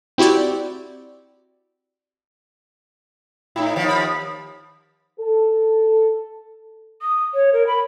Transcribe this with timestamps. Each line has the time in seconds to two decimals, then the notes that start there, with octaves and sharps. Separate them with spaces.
0.18 C4 E4 F#4 G4 D5
3.56 A2 D#4 E4
3.76 D#2 F3
3.88 B5
5.20 A4
7.02 D#6
7.34 C#5
7.53 A#4
7.67 B5